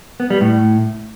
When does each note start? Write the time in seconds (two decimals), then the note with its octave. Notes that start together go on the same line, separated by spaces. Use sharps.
0.20 B3
0.30 G3
0.41 A2